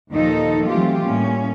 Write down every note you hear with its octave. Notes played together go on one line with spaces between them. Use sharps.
D#2 A#2 D#3 F3 D#4 A4
E3 F#3 A3 C4 F4 G4
A2 G3 A#3 C#4